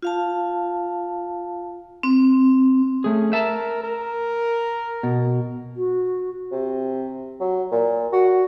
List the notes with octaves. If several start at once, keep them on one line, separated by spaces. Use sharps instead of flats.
F4 F5 A5
C4
A3 C#4 G#4
A#4 E5 A5
A#4
B2
F#4
C3
F#3
A#2
F#4